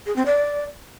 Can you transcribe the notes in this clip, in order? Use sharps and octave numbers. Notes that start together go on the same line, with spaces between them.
G#4
C4
D5